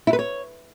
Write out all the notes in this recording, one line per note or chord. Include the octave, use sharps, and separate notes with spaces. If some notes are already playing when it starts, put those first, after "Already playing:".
E4
B4
C#5